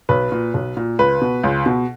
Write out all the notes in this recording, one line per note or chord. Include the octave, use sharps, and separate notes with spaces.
B1 B4
A#2
B1
A#2
C#2 B4
B2
C#2
B2